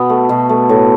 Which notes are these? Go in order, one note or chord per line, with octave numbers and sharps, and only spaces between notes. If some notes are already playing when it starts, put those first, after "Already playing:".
Already playing: B2 B3
A3
B2
A3
A2